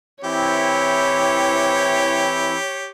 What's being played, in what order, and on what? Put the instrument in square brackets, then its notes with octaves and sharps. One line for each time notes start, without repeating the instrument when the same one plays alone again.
[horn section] E3 C4 E4 [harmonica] G4 [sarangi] C#5